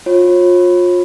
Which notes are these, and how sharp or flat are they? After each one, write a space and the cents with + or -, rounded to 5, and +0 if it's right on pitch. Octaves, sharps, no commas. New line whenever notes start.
F4 +30 C#5 -40